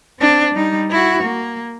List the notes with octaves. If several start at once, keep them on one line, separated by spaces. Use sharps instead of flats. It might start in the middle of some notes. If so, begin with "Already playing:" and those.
C4 D4
G3 D#4
E4 F#4
A#3